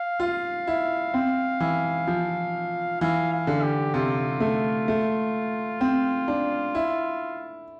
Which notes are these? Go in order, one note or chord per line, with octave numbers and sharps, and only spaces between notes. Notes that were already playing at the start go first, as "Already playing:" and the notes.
Already playing: F5
F4
E4
C4
E3
F3
E3 F5
F5
D3
G4
C3 F4
A3
A3
C4
D4
E4